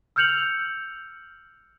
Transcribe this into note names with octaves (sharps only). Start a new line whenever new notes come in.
E6 F6 G6 C#7 F7 F#7